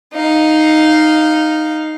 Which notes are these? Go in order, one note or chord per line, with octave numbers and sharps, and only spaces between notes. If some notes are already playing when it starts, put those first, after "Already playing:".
D#4 F5